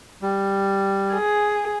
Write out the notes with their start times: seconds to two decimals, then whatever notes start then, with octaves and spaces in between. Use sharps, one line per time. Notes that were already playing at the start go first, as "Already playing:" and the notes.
0.22 G3
1.12 G#4